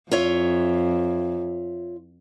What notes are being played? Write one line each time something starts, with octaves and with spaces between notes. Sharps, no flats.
F2 F4 C#5 E5